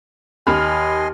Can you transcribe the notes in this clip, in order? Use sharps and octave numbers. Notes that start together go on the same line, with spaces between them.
D#2 D#5 G#5 B5 C6 F6